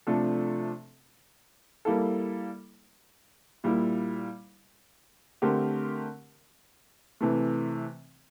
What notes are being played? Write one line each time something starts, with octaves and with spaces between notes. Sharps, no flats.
C3 F3 A3 D4 A4
G3 A#3 E4 A4
A#2 G3 A#3 E4
D3 A3 C4 G4 A#4
C3 E3 A3